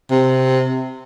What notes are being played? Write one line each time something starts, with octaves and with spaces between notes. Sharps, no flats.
C3